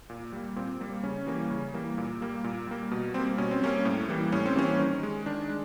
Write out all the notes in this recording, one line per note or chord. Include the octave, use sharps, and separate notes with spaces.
A#2
G3 A#3
A#2 C4
G3 A#3
C#3 C#4
E3 G3 A#3
C#3
E3 G3 A#3
A#2
G3 A#3
A#2
G3 A#3
B2
G3 A#3 C4
B2 C#4
C4
G3 A#3 C#4
A2
E3 G3 A#3
A2 C#4
C4
E3 G3 A#3 C#4
D#3
G#3
D#3 D4
G#3